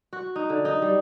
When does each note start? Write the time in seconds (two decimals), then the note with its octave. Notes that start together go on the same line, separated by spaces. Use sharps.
0.13 F#4
0.36 D#4
0.50 D3
0.65 D#4
0.82 G3